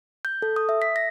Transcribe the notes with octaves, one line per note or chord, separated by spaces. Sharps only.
G6
A4
D#6
E5
B6
A#6